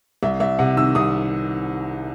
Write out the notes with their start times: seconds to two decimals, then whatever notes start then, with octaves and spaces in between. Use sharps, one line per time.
0.23 C2 E5
0.40 C2 E5
0.59 C3 F#5
0.77 D#3 E6
0.95 C2 D#6